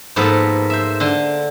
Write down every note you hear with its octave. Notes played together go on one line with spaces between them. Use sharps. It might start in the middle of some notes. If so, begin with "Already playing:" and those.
G#2 F3 A#3 B3 A4 B4
C5 E5
D3 C6